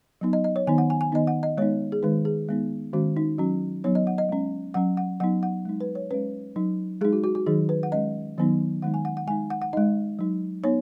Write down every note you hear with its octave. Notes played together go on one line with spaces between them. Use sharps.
F#3 B3 D#4
D#5
D#5
C#5
D#3 B3 D#4 G#5
F#5
G#5
G#5
D#3 B3 D#4 D#5
F#5
D#5
G#3 B3 D#4 C#5
G#4
D#3 G#3 D#4 B4
G#4
G#3 B3 D#4
D#3 G#3 C#4 F#4
D#4
F#3 C#4 F#4
F#3 B3 D#4 C#5
D#5
F#5
D#5
G#3 C#4
F#3 C#4 F#5
F#5
F#3 B3 D#4 F#5
F#5
G#3 D#4
B4
C#5
G#3 C#4 B4
F#3 D#4
G#3 D#4 G#4
F#4
F#4
F#4
D#3 F#3 D#4 G#4
B4
F#5
G#3 C#4 D#5
D#3 F#3 B3 D#4
D#3 G#3 D#4 F#5
G#5
F#5
F#5
G#3 D#4 G#5
F#5
F#5
G#3 D#4 D#5
F#3 D#4
B3 D#4 C#5